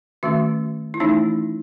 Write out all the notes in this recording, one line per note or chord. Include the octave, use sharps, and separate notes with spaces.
D#3 A3 C#4 F#4
E4
E3 A3 C#4 D#4